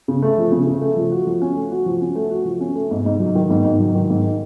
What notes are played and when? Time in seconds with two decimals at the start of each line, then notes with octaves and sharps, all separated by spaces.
0.08 C#3
0.22 A3
0.38 F3
0.52 C#3
0.67 C#3
0.82 A3
0.96 F3
1.12 F#4
1.27 F3
1.42 C#4
1.56 A3
1.72 F#4
1.86 F3
2.01 C#4
2.15 A3
2.31 F#4
2.45 F3
2.61 C#4
2.75 A3
2.91 G#2
3.06 G#2
3.20 F#3
3.35 D#3
3.50 G#2
3.65 G#2
3.80 F#3
3.95 D#3
4.10 G#2